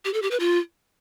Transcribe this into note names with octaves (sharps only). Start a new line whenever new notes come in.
G4
A4
G4
B4
F4